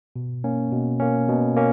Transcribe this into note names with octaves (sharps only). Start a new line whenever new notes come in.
B2
A#3 C#4
B2
A#3 C#4
B2
A#3 C#4